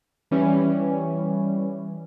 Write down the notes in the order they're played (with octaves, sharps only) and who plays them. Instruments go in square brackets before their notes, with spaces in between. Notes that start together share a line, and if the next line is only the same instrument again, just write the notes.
[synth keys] E3 G3 C#4